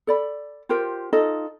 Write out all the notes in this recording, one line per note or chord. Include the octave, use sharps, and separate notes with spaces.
A4 D5 B5
F4 G4 A#4 C5
D#4 F4 A4 D#5